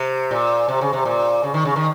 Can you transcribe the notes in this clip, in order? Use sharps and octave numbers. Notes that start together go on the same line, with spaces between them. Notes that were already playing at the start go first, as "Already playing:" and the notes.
Already playing: C3
A#2
C3
C#3
C3
A#2
C#3
D#3
C#3
D#3